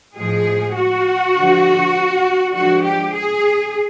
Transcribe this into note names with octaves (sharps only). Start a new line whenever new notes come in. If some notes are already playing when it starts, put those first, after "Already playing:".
A2 F3 G#3 G#4
F#4
D3 F3 G#3
D3 F3 G#3 F#4
G4
G#4